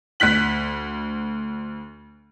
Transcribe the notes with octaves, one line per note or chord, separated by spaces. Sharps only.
D2 F#6 B6 F#7